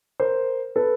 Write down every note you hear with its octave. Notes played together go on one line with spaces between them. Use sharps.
A#4 C5
A4 B4